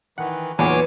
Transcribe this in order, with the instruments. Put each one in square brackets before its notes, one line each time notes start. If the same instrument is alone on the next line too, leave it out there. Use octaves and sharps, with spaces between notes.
[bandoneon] D#3 E3 [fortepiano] F#5
[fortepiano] B1 E2 A#2 [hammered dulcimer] E3 [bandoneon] C#5 G#5 D6